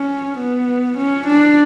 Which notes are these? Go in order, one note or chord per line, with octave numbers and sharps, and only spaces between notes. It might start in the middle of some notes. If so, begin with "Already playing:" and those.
Already playing: C#4
B3
C#4
D4